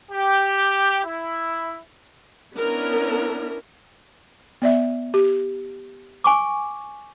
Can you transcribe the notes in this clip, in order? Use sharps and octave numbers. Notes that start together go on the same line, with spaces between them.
G4
E4
B3 C#4 D4 E4 A#4
B3 D5 E5
G4
G#5 C#6 D6